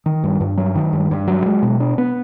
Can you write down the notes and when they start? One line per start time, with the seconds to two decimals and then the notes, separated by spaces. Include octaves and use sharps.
0.06 D#3
0.24 G2
0.40 G2
0.57 F#3
0.75 D#3
0.93 G2
1.11 G2
1.27 F#3
1.46 G#3
1.63 B2
1.80 D4
1.98 B3